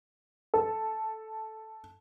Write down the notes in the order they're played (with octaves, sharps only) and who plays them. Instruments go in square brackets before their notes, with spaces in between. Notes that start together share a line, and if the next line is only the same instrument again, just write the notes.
[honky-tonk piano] A4